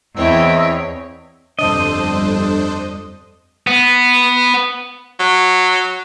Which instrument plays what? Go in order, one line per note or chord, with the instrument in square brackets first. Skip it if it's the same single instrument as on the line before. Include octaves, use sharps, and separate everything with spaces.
[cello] E2 [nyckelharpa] C4 [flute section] E4 D#5 E6 [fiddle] C#5 G5
[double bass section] G1 F2 G3 [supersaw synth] D4 A4 C5 [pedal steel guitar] D#5
[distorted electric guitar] B3
[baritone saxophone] F#3